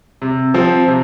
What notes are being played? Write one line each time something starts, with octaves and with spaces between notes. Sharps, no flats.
C3
F3 C4
C3